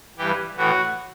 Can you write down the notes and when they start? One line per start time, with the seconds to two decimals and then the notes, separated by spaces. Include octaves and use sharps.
0.17 G2 E3 G4
0.57 A2 E3 F#4